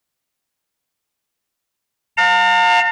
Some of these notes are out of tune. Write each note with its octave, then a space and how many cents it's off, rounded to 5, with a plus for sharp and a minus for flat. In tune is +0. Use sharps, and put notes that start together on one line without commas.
F5 +30 A#5 -45